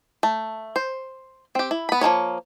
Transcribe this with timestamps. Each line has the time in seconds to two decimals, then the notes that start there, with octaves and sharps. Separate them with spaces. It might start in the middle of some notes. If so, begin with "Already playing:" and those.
0.23 A3
0.76 C5
1.55 C4 G4
1.71 E4
1.89 B3 B5
2.01 F3 A3 A#3 C#5